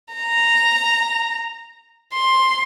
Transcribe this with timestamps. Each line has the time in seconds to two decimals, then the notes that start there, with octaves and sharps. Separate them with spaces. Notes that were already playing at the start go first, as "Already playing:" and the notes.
0.14 A#5
2.13 C6